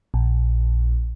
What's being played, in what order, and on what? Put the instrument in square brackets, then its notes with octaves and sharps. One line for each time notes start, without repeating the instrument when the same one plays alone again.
[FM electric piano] A#1